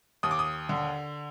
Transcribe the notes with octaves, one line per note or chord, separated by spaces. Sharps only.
D#2 D#6
D6
D#6
D3